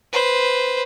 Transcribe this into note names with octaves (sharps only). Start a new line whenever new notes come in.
B4 C5